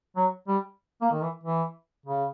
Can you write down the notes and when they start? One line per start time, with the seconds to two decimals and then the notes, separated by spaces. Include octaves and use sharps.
0.16 F#3
0.48 G3
1.01 A#3
1.12 D#3
1.22 E3
1.43 E3
2.06 C#3